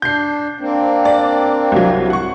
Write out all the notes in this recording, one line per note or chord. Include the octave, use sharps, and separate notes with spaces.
D4 G6 C7
A#3 C4 D4
D5
C2 F#3
F#5 C#6